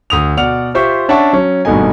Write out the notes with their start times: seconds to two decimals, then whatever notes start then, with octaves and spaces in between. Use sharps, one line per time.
0.10 D2 D#6 F7
0.37 B2 D5 F#5 F6 F7
0.74 F4 G4 C5 E5 C#6
1.09 C#4 D4 E5 F#5 A5 C#6
1.33 F#3 C#4
1.65 G#1 G2 B2 A3 D#4 G#5